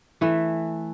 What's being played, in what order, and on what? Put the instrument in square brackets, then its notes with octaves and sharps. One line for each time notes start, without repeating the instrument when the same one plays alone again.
[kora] E3 A3